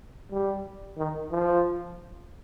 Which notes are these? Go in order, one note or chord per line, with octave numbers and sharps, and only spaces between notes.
G3
D#3
F3